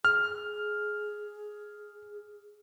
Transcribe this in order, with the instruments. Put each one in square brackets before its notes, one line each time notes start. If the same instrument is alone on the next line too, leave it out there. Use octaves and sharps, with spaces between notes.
[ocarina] G#4 [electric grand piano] F6